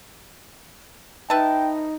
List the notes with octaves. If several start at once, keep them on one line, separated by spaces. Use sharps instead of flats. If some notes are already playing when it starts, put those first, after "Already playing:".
D#4 B4 E5 G5 A5